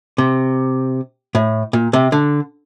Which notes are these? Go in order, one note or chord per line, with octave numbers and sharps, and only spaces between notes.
C3
A2
A#2
C3
D3